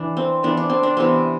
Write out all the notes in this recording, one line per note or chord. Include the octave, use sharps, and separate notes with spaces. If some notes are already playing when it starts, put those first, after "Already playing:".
Already playing: E3 D4
C4
E3 B3 D4
D4
C4
D4
C3 E3 B3 C4